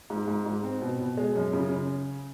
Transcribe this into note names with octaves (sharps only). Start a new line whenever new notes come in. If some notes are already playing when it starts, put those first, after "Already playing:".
G#2
G#2
G#2
C4
B2
B2
G#3
F#2
C#3
C#3